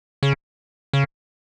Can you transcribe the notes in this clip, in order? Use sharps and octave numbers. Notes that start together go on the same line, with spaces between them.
C#3
C#3